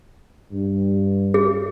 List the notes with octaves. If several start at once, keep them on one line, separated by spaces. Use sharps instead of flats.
G2
G#4